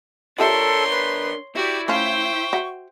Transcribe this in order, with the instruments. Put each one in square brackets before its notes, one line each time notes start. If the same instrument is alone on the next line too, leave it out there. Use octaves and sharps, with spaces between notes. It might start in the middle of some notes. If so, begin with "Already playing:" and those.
[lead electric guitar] D4 A#4 [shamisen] F4 G4 E5 [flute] A4 [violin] C#5 C6
[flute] B4
[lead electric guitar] E4 [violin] F#4 D5 [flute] G4
[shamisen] A3 C#4 F4 [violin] C5 G5 [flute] C#6
[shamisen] F#4 E5 F#5